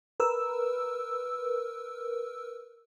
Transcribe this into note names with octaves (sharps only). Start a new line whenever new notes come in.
A#4 B4 E6